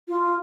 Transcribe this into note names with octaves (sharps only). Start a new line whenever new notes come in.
F4